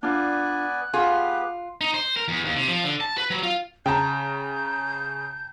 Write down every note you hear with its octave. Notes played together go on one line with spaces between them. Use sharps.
B3 D4 F4 D5 G#5 F#6
B3 F4 G4 G#4
D#4
C5
A#4
E2
D#2
C3
F3
D3
A5
B4
F#3
F4
C#3 G5 A5 A#5 G6